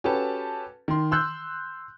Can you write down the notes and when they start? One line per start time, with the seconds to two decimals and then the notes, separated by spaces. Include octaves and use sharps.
0.04 C#4 F#4 G4 A4 B4 A5
0.88 D#3 C6
1.11 C6 E6 F#6 G6